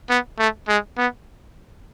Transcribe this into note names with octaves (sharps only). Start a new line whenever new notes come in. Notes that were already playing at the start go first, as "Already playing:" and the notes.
B3
A3
G#3
B3